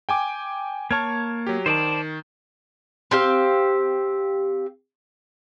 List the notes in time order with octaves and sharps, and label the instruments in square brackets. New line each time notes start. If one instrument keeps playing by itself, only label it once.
[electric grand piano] G5 G#5 D6
[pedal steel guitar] A#3 C#5 C#6 [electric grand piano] A5 F6 G#6
[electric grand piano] F#3 G4
[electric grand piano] D#3 [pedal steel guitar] C5 D5 A5
[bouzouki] C4 G4 F5